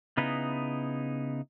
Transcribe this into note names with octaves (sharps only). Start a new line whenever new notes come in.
C#3 B3 D#4 E4